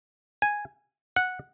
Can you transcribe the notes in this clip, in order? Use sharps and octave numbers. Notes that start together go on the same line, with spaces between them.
G#5
F#5